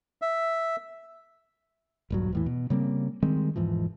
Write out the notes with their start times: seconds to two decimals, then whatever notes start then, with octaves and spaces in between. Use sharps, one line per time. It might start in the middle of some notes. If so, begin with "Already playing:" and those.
0.22 E5
2.10 D#1 G2 F#3
2.33 E2 A2 E3
2.46 B2
2.70 C#3 G3 A#3 C4
3.22 D#3 G3 G#3 C4
3.56 E1 G#2 E3 F3